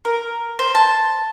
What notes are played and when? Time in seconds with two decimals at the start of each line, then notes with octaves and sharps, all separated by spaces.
0.05 A#4
0.59 C5
0.75 A5